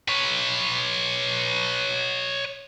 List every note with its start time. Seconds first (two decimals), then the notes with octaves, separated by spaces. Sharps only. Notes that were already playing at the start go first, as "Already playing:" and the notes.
0.08 B4 C#5